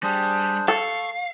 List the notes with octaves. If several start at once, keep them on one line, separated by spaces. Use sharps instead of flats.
G3 D4 G#4 C5
A4 F5 C#6